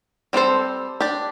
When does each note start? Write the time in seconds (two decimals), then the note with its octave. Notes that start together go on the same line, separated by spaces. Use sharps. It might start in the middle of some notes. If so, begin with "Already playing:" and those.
0.33 G3 C4 F#4 A4 C5
1.00 D4 G4 D5